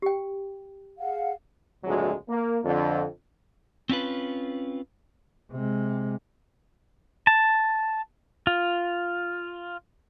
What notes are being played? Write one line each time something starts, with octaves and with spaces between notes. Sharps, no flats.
G4 G5
G#4 F5 F#5
G#1 D2 A#2 F#3 G#3
A#3
F2 D3
C4 C#4 F4 B4
C3 G#3
A5
F4